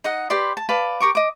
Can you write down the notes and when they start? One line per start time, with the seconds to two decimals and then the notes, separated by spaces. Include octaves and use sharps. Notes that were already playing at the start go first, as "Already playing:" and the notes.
0.04 D#4 D#5 F#5
0.30 G4 B4 D5 C6
0.57 A5
0.69 B4 D5 F5 A5
1.00 G4 A#4 C#6 D6
1.15 D#5 D6